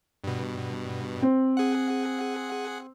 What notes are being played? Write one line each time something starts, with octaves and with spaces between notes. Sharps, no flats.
G2 B2
C4
G#4 F#5